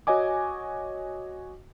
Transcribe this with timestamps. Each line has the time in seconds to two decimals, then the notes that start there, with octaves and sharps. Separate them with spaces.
0.07 F#4 C#5 D#5 G#5 D6